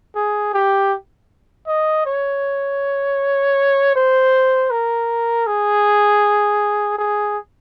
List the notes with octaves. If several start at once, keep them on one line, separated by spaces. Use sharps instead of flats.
G#4
G4
D#5
C#5
C5
A#4
G#4
G#4